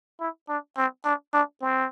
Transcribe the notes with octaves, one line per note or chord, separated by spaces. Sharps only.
E4
D4
C4
D4
D4
C4